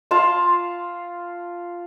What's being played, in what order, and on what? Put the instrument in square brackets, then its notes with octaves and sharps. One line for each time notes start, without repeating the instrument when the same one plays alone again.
[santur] F4 A5 C6